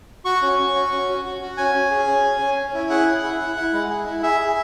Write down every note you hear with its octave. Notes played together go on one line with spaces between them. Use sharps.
F#4 C#6
C#4
C#4
F#4
C#4
F#4
F#4
F#4
C#4 G#5
C#4
G#4
C#4
C#4
C#4
C#4
E4
G#4 F#5
G#4
E4
E4
E4
G#3
G#4
E4
G#4 E5
G#4